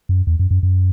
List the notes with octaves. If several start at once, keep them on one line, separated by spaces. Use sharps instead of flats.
F#2
E2
F#2
F#2
F#2